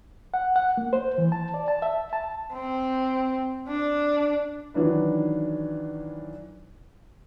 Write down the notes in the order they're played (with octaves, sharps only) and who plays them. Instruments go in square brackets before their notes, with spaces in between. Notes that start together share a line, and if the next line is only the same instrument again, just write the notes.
[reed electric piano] F#5
F#5
A#3
C5
E3
A5
D5
A5
E5
A5
[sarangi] C4
D4
[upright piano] D#3 E3 F#3 D4 B4